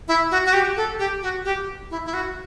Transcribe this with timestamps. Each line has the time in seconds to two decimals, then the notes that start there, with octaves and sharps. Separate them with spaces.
0.08 E4
0.31 F#4
0.46 F#4
0.53 G4
0.77 A4
0.99 G4
1.23 F#4
1.45 G4
1.91 E4
2.05 E4
2.14 F#4